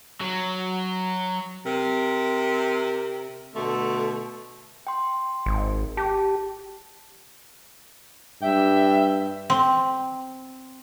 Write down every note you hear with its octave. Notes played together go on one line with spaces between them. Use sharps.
F#3
C3 A#4
B2 D3 A3
G5 C6
G#1
G4 A5
G2 E5 G5
C4